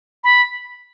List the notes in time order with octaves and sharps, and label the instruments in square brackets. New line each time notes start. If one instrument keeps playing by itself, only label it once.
[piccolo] B5